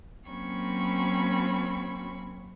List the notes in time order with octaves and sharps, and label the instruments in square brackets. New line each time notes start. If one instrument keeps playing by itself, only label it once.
[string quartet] F#3 A#3 C4 C#4 B5 C#6